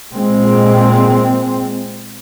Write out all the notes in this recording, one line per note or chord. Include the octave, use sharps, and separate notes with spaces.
A#2 G#3 C4